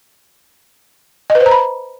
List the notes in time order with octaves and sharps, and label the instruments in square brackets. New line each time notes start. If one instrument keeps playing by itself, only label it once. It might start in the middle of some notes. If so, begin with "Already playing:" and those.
[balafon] D#5
B4
C5
A#5
B5